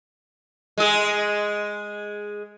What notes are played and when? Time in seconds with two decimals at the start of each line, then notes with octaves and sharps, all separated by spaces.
0.78 G#3 G#4